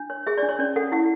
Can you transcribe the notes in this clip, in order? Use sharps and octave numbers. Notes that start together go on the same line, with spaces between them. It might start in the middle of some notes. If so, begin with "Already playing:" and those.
Already playing: D4
C#5
G#4 E5
D4 D5
C#5
C#4 D5
A4 F#5
E4 F#5